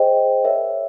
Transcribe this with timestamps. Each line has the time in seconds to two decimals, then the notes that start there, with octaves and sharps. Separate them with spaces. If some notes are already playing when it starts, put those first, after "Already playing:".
Already playing: G#4 C5 D#5 G5
0.44 A#4 C#5 E5